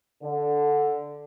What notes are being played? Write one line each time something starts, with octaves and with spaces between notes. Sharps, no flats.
D3